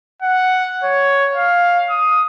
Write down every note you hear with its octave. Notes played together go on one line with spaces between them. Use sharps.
F#5
C#5
F5
D#6